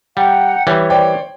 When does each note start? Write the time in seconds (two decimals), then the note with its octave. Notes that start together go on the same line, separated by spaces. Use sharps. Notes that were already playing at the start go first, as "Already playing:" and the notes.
0.17 G3 F#5 G5 A#5
0.67 E3 G3 C#5
0.90 C5 D5 G5